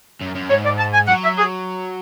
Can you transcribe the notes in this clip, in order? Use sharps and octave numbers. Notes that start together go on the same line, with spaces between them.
F#2
F#2
G#2 C#5
D5
A5
G#5
F#3 F#5
E5
G#4